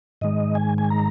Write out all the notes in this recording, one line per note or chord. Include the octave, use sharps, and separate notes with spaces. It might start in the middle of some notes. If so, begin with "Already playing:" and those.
G#2 D#3 G#3 D#5
G#5
G#5
A#5